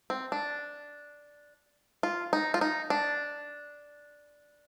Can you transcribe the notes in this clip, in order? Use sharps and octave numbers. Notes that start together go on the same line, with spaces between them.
C4
D4
F4
D#4
F4
D#4
D4